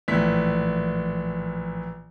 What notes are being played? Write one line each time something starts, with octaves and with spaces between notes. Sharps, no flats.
A#1 A2 E3 B6